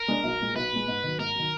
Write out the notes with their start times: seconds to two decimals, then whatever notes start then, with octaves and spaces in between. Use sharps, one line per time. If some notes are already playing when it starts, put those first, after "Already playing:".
Already playing: A#4
0.08 G#3 D4 G#4
0.24 B1
0.40 A#2 G#3
0.56 B1 B4
0.72 A#2 G#3
0.88 G#2
1.03 D#3 F#3
1.19 G#2 A#4
1.35 D#3 F#3